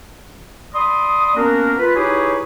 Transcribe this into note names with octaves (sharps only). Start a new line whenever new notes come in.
D5 B5 C6 D#6
A#3 B3 C#4 D4 F#4 A#4
F4 B4 B5
D#4 E4 G4 G#4 B4 C#5